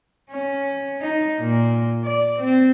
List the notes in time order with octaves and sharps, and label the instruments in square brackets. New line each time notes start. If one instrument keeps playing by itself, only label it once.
[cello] C#4
D#4
A#2
D5
C4